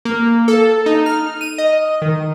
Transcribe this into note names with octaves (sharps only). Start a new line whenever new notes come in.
A#3
A4
D#4
F6
D#7
D#5
D#3